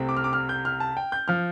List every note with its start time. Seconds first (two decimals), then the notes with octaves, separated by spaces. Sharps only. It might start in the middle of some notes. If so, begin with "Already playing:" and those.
Already playing: C2 C3 A3 C4
0.09 D6
0.17 F6
0.24 D6
0.33 F6
0.49 G6
0.65 F6
0.80 A5
0.97 G5
1.12 G6
1.28 F3 F6